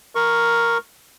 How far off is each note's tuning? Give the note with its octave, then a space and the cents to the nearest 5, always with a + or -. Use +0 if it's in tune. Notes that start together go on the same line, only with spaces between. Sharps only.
A#4 +0 C#6 -5